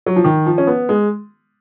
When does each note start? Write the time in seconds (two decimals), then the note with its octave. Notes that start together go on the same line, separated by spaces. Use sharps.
0.06 F#3
0.16 F3
0.24 D#3
0.46 F3
0.58 C#4
0.67 B3
0.89 G#3